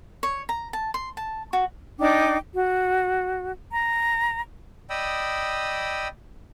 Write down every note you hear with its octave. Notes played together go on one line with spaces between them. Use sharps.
C#5
A#5
A5
C6
A5
F#4
D4 D#4 G5 D6
F#4
A#5
D5 D#5 G5 B5 D#6 E6